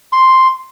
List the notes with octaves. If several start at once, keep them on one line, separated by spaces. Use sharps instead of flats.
C6